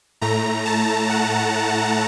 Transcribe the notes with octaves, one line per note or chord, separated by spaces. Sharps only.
A2 A3 A#5
A5
F#5